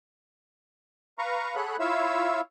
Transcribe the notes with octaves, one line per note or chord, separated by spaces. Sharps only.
B4 F5 A#5 C#6
G#4 A4 C#5 F#5 B5 F#6
E4 F4 C#5 E5 F5 E6